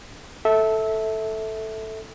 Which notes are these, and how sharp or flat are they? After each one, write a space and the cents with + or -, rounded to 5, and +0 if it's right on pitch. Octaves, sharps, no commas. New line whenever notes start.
A4 +0 E5 -20